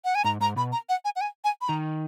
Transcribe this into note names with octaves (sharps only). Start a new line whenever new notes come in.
F#5
G#5
G#2 A#5
G#2 A#5
B2 B5
A#5
F#5
G#5
F#5
G#5
G#5
B5
D#3 A#5